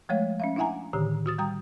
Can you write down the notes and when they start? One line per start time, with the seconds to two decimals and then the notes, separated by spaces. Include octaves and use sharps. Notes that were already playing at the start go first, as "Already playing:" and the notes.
0.09 F3 G#3 A3 C#5 F5
0.40 C#4 E5 F5
0.56 D4 E4 E5 F#5 G#5 A#5
0.93 A2 D3 D#3 G4
1.26 F#4 D#6 A6
1.38 G3 G5 A#5 D#6